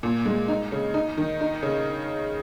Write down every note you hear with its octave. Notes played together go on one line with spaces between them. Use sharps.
A#2
G#3
D#4
C#3
D#4
D#3
D#4
C#3